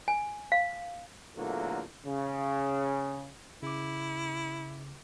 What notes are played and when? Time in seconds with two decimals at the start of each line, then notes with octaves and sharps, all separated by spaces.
0.08 G#5
0.52 F5
1.36 E2 A#2 D3 F#3 A3 A#3
2.06 C#3
3.63 C#3 E4 D6